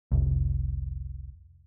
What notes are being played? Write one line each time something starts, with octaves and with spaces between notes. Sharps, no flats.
F1 C2